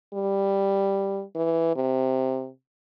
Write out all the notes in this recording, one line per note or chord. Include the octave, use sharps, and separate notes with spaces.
G3
E3
C3